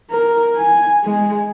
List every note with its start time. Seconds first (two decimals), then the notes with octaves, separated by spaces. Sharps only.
0.11 A#4
0.56 G#5
1.04 G#3